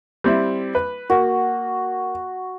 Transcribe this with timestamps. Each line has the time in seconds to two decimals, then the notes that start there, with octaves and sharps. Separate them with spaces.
0.24 G3 C4 E4
0.75 B4
1.10 A#3 F#4